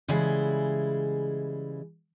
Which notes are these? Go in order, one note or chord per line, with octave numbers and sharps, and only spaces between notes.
C#3 E3 G3 G#3 E4 G#4